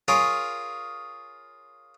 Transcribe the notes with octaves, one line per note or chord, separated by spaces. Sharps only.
F4 G#4 A#4 C#5